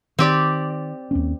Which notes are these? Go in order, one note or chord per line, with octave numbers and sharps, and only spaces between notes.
D#3 C4 G4 D5
D#2 C4 C#4